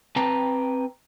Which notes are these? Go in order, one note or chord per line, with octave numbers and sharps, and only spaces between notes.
C4 B4 G5 A5 A#5